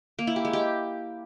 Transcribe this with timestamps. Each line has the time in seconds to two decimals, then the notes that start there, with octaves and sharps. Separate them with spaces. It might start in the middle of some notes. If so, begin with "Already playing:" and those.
0.19 A#3
0.27 E4
0.36 G4
0.45 G#3
0.53 G4